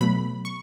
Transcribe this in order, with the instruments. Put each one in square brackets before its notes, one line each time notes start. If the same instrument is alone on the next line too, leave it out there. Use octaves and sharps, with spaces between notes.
[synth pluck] B2 F#3 A3 B5
C#6